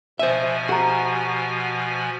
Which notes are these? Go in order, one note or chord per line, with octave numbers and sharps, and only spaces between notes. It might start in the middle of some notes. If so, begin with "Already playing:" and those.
B2 F3 C5 E5 G#5
F#4 G4 A#5